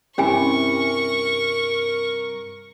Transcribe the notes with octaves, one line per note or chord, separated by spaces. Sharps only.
G2 C3 C#4 E4 G4 A#4 G#5 C#6